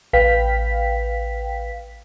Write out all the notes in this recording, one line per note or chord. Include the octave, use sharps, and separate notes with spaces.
A1 B4 F5 G5 B6